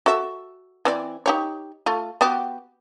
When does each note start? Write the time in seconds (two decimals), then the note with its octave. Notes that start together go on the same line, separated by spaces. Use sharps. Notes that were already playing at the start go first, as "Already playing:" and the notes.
0.06 F#4 A4 E5
0.85 E3 C4 D5
1.26 D#4 G4 C#5
1.86 A3 F4
2.21 B3 F#4 G4